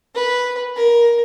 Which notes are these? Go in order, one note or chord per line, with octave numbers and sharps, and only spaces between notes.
B4
A#4